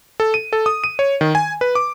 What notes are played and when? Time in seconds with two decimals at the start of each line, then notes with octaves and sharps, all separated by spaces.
0.20 A4
0.34 D#7
0.53 A4
0.66 D#6
0.84 D#7
0.99 C#5
1.21 D#3
1.35 G#5
1.61 B4
1.75 D6